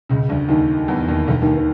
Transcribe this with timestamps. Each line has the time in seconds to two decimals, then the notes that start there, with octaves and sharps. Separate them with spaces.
0.09 C#2 C#3
0.29 D2 D3
0.49 D#2 D#3
0.88 E2 E3
1.09 D#2 D#3
1.28 D2 D3
1.42 D#2 D#3
1.57 D#3